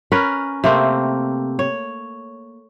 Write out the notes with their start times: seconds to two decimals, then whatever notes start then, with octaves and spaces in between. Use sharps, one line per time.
0.12 C#4 A#4 B4
0.64 C3 A3 A#3 C4
1.59 C#5